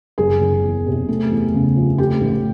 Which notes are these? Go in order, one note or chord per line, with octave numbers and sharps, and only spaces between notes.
F#1 G#4
F#1
E2
C3
A3
E2
C#3
F3
A3 G4
A1